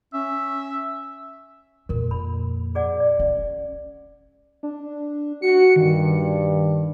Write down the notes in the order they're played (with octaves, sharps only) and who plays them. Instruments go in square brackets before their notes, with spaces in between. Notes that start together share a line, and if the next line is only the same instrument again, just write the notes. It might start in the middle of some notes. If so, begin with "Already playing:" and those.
[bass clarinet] C#4 [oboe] E5
[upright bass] F2 A#2 [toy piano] A#4
[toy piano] B5
G#4 D5 F#5
D5
[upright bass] C#4
[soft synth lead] D4
[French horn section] F#4 [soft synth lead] C#7
[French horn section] G2 [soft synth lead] D#3